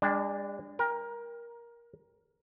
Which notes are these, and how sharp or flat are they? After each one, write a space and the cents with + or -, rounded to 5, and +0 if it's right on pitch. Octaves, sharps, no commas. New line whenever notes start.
G#3 -40 D4 +0 G5 +15
A#4 +15 G5 +35